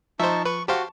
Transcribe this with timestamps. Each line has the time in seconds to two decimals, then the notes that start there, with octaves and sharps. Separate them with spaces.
0.20 F3 D#4 C5 E5 A5 C#6
0.45 B4 C#6
0.68 F#4 G4 C5 F5 A5 C#6